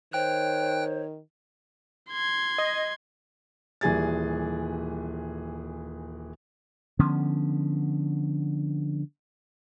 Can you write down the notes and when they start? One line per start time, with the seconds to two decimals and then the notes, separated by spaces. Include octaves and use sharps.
0.13 D#3 C5 C#5 G5 F#6
2.10 C6 G#6
2.58 D#5
3.81 D#1 E3 G3 G#4 G#5 A6
6.99 D3 F3 B3 C#4